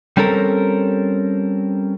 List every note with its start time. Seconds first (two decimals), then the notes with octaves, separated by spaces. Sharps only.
0.17 G3 C4 C#4 A4 A#4